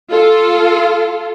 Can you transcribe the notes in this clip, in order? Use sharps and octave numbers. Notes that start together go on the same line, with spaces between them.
F4 A4